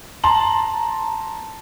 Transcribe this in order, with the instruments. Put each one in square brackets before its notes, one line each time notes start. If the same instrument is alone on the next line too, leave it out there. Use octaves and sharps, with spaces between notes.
[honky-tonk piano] A5 A#5 C6 F#7